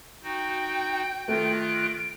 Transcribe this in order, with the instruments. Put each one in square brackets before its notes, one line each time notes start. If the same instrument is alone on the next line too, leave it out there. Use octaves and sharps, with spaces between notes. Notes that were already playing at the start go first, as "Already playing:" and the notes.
[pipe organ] D#4 F#4 [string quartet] G5
[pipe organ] D#3 F4 F#6 [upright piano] A3 [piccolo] D7